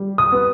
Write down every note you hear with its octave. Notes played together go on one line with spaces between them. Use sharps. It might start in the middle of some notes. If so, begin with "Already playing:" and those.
Already playing: G3
D#6
B3